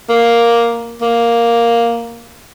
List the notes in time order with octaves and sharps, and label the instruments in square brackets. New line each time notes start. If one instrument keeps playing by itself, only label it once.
[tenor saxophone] A#3
A#3